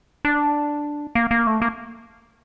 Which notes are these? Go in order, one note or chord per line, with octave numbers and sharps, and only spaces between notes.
D4
A#3
A#3
A3
A#3